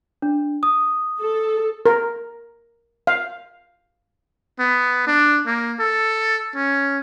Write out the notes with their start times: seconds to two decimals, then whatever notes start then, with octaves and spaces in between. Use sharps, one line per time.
0.22 D4
0.63 D#6
1.20 A4
1.86 A#4
3.07 F5
4.59 B3
5.07 D4
5.47 A#3
5.80 A4
6.55 C#4